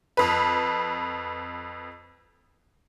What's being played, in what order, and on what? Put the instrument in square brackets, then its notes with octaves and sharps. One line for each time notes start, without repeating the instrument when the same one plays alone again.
[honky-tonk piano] F2 B4